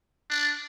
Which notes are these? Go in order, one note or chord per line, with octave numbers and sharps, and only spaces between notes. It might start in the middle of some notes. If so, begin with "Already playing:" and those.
D4